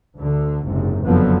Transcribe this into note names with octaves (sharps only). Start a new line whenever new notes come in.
D2 D3
F#1 G#2 C3
F#1 F2 D3 F3 F#3 B3